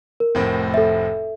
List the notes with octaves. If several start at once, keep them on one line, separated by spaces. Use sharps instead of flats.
A#4
F1 A2 C4
A4 E5